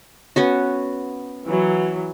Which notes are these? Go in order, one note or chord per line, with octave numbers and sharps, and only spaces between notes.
B3 C#4 F#4
E3 F#3